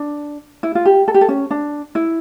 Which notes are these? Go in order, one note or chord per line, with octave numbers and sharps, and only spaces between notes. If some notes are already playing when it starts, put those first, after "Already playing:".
Already playing: D4
E4
F4
G4
A4
G4
A4
C#4
D4
E4